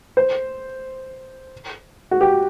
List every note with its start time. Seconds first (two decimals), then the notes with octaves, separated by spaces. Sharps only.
0.17 C5
2.11 F#4
2.21 G4